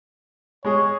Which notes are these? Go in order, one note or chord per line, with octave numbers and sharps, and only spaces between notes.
G#3 G#4 C#5